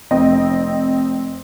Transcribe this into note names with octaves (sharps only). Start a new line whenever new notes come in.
F1 C4 D#5